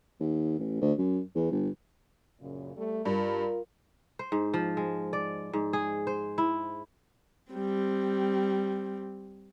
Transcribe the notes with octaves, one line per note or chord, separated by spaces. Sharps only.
D#2
A1
D2
F#2
E2
G1
F#2 A#2 C#3
G3 A3
G2 F4 A#4
C5
G#2
F3
G#3
D5
G#2
G#4
C5
E4
G3 C4